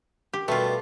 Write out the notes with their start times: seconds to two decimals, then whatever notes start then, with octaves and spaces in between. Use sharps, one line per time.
0.33 G4
0.48 B2 G3 A3 F4